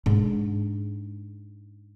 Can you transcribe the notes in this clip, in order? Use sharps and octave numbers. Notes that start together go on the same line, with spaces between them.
G#2 D4